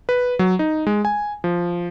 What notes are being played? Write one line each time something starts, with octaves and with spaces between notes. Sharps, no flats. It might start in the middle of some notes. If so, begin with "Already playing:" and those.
B4
F#3
D#4
G#3
G#5
F3